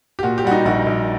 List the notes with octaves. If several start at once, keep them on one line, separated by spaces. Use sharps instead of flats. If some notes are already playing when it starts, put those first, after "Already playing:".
G4
A#2 F#4
G4
G3 F#4
D#4
A#1 F#4
A#1